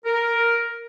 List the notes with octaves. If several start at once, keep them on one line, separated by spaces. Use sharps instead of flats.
A#4